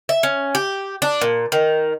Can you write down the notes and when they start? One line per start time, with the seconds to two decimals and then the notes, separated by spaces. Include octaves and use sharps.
0.09 E5
0.23 C#4
0.55 G4
1.02 D4
1.21 A#2
1.52 D#3